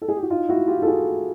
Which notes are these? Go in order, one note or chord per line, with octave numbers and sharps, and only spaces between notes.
A4
G#4
G4
F#4
D#4 F4
E4 F#4
F4 G4
A4
F#4 G#4